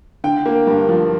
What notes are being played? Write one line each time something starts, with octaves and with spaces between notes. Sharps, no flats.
D3 G5
A#3
G2
F3